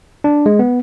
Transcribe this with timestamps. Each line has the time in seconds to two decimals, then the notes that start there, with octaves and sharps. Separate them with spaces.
0.24 D4
0.46 G#3
0.59 B3